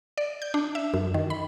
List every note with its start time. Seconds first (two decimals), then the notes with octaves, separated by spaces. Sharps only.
0.17 D5
0.42 G6
0.54 D4
0.75 E5
0.94 F#2
1.14 D#3
1.30 B5